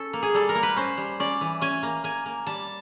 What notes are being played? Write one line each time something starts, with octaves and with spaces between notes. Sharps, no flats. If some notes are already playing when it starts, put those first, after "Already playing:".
Already playing: C#4 A4
A#3
G#4
G3 A4
A#4
A#3
B4
C#4 C5
G3
C#4 D5
E3
C#4 G#5
A#3
A#3 G#5
A#3
G3 A5